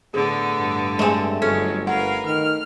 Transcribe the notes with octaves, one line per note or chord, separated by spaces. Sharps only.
A2 D3 B3 G#4
G2
G#3 A3 C4 G#4 G#5
G1 G2 F#3 G#3 C#4 A4
A#4 B4 F5 F#5
D#3 F6